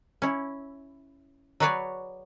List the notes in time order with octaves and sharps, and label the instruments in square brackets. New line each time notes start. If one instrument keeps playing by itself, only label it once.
[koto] C#4 E4
F#3 F#4 G#4 B4 C#5 D5